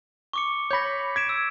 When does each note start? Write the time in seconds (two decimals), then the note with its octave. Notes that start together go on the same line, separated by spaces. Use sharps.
0.33 C#6 D6 C#7
0.71 C#5 B5 G6 A#6
1.16 G#6 B6 D7 E7
1.29 E6